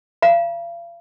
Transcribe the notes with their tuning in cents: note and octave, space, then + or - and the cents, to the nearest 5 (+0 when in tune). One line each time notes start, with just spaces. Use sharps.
F5 -40 A#5 +35